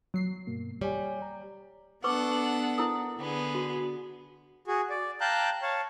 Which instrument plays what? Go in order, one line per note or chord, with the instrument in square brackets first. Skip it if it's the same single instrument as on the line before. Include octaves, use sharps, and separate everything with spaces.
[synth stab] F#3 C7
[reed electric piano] G2 B2 A#3
[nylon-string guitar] G3 [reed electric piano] C#5 G#5
[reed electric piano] A#5
[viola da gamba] B3 D4 [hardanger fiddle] A4 F#5 [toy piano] B4 C#6 D6
[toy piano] E4 A#4 D#6
[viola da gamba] D3 [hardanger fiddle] B3 G#4
[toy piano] F#4
[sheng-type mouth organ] F#4 G#4
D5
F5 G5 A5 A#5 F#6 G6
C#5 F5 A5